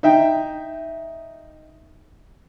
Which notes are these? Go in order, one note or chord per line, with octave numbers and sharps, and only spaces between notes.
D#4 E5 G5